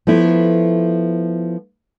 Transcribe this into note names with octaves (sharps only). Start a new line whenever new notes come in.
F3 A3 B3 E4